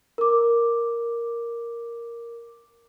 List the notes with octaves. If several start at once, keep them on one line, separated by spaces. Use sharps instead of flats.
A#4 D6